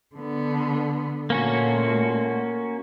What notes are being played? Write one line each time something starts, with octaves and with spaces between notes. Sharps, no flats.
D3 B3
A#2 A3 A#3 C#4 F#4